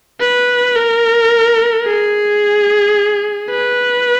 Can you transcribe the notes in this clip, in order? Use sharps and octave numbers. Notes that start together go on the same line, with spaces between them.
B4
A#4
G#4
B4